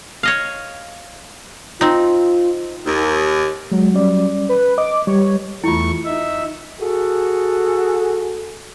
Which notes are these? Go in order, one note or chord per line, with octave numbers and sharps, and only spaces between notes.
C#5 D#5 F5
C4 D#4 F4
D#2
F#3 G#3
G3 C#4 D5
B4
D#5 D6
G3 C#5
E2 A3 E4 F4 C#6
D#4 E5
F#4 G#4 A4